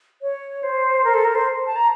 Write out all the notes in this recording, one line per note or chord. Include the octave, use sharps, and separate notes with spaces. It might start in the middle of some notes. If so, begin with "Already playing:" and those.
C#5
C5
A#4
A4
A#4
C5
A5
A#5